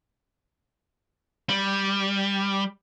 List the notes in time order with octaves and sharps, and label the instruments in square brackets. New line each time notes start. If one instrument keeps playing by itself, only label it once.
[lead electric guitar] G3